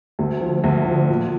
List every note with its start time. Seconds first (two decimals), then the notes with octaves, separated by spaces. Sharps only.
0.19 D2
0.41 F3
0.64 D2
0.86 F3
1.09 A#2